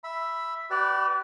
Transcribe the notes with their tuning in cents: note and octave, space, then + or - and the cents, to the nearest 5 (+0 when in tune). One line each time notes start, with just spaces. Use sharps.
E5 +5 B5 +0
G4 -40 B4 +0 D5 +0